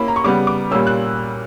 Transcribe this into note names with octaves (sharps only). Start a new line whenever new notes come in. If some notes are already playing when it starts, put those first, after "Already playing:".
Already playing: A#3 C#4 E4 B5
A#5
C#6
C#3 G3 B3 D6
D6
A#2 G3 A#3 C#4 E6
F#6